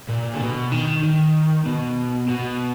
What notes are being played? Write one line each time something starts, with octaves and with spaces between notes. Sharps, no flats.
A#2
D3
B2
D#3
D#3
B2
B2